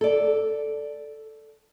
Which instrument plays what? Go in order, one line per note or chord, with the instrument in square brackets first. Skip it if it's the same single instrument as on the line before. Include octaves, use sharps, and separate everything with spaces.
[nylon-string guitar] A4 D5